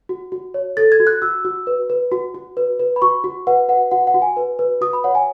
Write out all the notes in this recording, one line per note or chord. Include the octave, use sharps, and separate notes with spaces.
F#4
F#4
C#5
A4 A6
G#6
F#4
F#6
F#4 E6
F#4
B4
B4
F#4
F#4
B4
B4
B5
F#4 C#6
F#4
B4 F#5
B4 F#5
F#4 F#5
F#5
F#4
G#5
B4
B4
F#4 D#6
B5
C#5 F#5
G#5